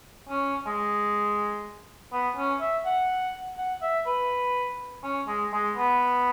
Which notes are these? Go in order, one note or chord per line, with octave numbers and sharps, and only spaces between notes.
C#4
G#3
B3
C#4
E5
F#5
F#5
E5
B4
C#4
G#3
G#3
B3